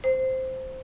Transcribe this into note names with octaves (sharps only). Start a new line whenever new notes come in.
C5